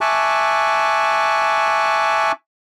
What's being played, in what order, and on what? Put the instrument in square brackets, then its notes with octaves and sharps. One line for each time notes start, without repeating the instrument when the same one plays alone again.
[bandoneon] E5 G#5 A5 C#6 D6 F#6